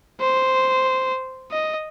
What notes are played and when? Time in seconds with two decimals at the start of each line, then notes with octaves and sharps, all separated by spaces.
0.21 C5
1.52 D#5